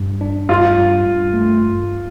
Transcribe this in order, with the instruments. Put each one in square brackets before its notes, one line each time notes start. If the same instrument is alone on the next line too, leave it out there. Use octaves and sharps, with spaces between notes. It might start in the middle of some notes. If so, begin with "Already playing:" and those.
Already playing: [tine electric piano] G2
D4
[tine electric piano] G2 [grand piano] F4
[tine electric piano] G2
G2
A3